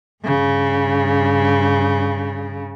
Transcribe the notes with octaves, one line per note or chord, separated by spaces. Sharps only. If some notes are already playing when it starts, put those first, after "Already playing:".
G2 C#3